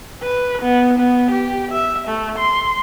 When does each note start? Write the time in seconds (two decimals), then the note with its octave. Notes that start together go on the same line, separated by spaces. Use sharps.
0.22 B4
0.62 B3
0.99 B3
1.31 G4
1.71 E5
2.08 A3
2.38 C6